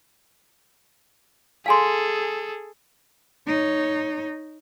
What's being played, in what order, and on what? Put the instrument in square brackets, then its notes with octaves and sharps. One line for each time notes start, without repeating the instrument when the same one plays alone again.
[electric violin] G#4 A4 [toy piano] F5 G#5 C6
[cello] D#4 C#5